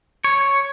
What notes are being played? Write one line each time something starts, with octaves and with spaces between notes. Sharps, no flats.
C#5